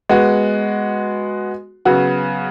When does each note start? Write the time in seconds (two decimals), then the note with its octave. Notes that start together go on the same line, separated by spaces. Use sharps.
0.09 G#3 B3 F#4
1.85 C#3 F#3 B3 F#4